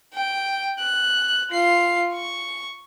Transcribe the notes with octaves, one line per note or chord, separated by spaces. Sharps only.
G5
F#6
F4 C7
C#6